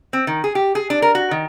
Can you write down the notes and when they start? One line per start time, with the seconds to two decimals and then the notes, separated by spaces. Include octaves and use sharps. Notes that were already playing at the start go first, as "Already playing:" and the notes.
0.13 C4
0.27 D#3
0.44 G#4
0.55 G4
0.75 G#4
0.90 D4
1.02 A#4
1.15 F#4
1.31 D#3